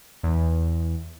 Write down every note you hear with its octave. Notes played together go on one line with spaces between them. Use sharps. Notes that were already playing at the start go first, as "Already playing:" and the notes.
E2